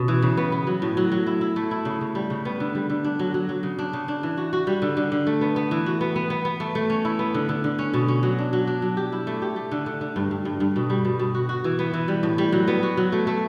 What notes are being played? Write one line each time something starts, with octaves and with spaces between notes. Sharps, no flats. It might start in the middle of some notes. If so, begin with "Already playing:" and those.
Already playing: B2 C#4
E3
C#3
B3
B3
F#3
A2
F#3
F#3
E4
E4
A3
E4
C#3
C#3
G3
C#3
B3
D3
G3
D3
D4
F#3
F#3
F#3
C#3
D4
C#3
D4
E3
F#4
F#4
G3
D3
D3
D3
A3
B3
B3
E3
F#4
B3
B3
B3
B3
A3
A3
C#4
E4
B3
D3
D3
D3
C#4
B2
C#4
F#3
D4
F#3
D4
F#3
G4
E4
A3
G4
A3
D3
D3
D3
G2
G2
G2
G2
B2
G3
B2
B2
F#4
F#4
E3
B3
E3
G3
A2
G3
F#3
B3
F#4
F#3
A3
A3